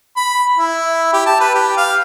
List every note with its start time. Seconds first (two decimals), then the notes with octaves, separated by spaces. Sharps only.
0.16 B5
0.58 E4
1.13 G4
1.26 A5
1.40 B4
1.54 G4
1.77 F5